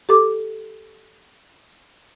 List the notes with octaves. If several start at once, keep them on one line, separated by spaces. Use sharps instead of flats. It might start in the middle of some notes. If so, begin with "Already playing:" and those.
G4 A4 D6